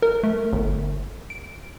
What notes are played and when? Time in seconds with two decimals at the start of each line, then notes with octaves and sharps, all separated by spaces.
0.02 A#4
0.23 A3
0.53 G1
1.30 D7